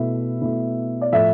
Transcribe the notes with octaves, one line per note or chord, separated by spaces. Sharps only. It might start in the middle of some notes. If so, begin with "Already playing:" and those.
Already playing: B2 A3 E4 E5
B2 A3 E4
D5
A2 F3 A3 E5